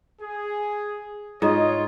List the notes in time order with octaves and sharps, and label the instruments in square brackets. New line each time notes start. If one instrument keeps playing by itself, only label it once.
[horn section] G#4
[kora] G#2 [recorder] F4 [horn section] C#5 [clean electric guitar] D#5